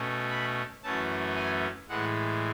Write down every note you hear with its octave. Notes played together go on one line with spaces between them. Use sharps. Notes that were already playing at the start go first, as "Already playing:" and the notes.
Already playing: B2 A3 C#4
B5
F#2 E3 A3 C#4 A5
G#5
A2 E3 G#3 F#5